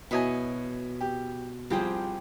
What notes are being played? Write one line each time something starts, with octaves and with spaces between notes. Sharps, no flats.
B2 E4 B4 C#5 D#5 G#5
G4
C2 F3 G4 G#4 C5 G5